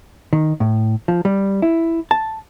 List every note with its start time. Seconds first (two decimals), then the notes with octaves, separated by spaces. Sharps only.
0.33 D#3
0.60 A2
1.08 F3
1.25 G3
1.62 E4
2.11 A5